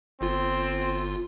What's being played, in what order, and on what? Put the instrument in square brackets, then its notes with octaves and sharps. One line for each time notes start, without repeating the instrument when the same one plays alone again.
[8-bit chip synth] G1 F4 [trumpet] C4